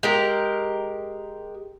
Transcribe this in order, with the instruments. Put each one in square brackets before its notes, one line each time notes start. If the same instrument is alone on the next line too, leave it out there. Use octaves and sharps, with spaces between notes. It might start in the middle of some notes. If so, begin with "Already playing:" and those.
[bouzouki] G#3 G4 A#4